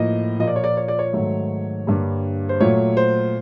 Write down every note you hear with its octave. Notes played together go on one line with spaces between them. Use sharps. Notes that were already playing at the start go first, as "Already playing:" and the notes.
Already playing: A2 F3 A#3 D#5
A#2 F3 A#3 D#5
D5
C#5
D5
C#5
D5
C#5
G#2 D#3 F#3 A3
G2 D3 G3 A#3
C5
A#2 F#3 A3 C#5
C5